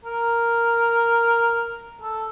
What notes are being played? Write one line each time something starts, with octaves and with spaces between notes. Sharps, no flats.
A#4
A4